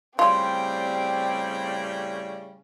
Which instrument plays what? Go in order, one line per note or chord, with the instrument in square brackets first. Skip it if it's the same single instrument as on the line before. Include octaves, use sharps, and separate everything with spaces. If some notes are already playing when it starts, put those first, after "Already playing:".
[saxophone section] A2 C#3 G3 [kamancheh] C4 [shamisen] F4